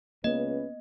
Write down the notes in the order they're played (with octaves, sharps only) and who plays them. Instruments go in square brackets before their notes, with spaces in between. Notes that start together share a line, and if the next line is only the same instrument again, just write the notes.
[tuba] C#2 [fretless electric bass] A#3 B3 [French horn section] C#4 B4 [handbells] D#5